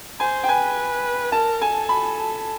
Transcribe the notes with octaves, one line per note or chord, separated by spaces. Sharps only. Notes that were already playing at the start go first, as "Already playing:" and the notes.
C5 G#5
G5
B4 G#5
A#4 A5
A4 G#5
B5